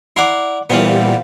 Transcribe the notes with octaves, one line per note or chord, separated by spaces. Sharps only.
E4 D5 F#5 A#5 C6
A#2 E3 G3 B3 C5 F5